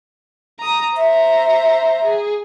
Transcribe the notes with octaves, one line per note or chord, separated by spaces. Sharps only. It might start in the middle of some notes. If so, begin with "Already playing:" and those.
A#5 D#6
C5 E5 A#5
G#4